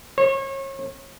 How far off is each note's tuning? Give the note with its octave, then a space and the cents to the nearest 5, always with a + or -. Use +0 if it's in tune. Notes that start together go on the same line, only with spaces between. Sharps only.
C#5 -35